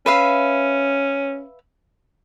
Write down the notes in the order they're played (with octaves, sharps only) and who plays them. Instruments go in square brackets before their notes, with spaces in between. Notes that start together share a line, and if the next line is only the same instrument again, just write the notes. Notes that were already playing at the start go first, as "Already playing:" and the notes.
[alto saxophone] C#4 [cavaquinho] B4 E5 F5